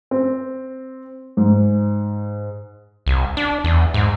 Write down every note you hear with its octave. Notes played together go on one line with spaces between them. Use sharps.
C4
G#2
C2
D4
E2
G#2